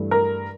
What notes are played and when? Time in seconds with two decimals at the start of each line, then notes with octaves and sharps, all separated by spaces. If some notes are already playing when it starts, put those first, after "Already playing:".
Already playing: G2 E3 A3
0.11 A#4